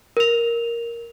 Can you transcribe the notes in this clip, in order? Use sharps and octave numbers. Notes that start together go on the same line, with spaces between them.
A#4 F7